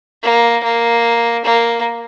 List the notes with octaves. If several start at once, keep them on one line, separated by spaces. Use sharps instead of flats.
A#3
A#3
A#3